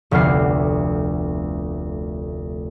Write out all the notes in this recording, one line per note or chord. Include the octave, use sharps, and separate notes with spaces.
F1 D2 B3 F6 C7